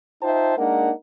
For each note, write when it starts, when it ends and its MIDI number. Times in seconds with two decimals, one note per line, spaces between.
0.23 0.55 63
0.23 0.55 65
0.23 0.55 72
0.23 0.55 76
0.23 0.55 79
0.23 0.55 81
0.58 0.91 56
0.58 0.91 58
0.58 0.91 62
0.58 0.91 63
0.58 0.91 70
0.58 0.91 78